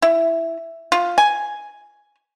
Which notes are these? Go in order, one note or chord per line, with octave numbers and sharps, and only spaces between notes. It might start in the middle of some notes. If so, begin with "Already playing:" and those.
E4
F4
G#5